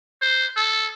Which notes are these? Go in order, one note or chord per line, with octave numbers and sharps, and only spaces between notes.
C5
A4